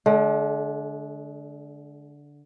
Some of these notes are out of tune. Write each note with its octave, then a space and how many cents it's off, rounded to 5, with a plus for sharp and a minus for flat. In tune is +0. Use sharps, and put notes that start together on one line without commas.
D3 -10 G#3 +45